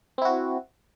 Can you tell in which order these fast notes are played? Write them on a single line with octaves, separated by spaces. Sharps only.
C4 E4 F#4